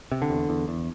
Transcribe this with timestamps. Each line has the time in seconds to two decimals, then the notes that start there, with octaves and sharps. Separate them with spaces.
0.12 C3
0.22 D3
0.30 E2
0.49 E2
0.68 E2